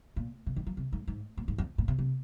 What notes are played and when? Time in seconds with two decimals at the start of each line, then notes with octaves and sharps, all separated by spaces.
0.16 A#2
0.46 C3
0.56 D#3
0.67 F3
0.77 C3
0.93 G#2
1.08 G#2
1.37 A#2
1.48 G#2
1.58 F2
1.78 A#2
1.88 C3
1.99 C3